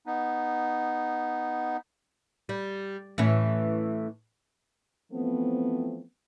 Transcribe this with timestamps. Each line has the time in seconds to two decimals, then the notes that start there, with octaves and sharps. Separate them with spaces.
0.06 B3 D#4
2.49 G3
3.18 A2 E3 C#4
5.12 E3 F3 A3 B3 C4